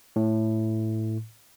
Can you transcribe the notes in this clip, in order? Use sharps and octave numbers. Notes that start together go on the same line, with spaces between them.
A2